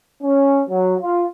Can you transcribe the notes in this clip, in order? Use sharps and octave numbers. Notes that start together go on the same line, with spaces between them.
C#4
F#3
F4